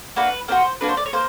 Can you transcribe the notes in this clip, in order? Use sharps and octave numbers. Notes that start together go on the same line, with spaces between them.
A#3 D4 F#4 B4
A#3 D4 F#4 C5
A#3 D4 F#4 B4
C5
D5
C#5
A#3 C5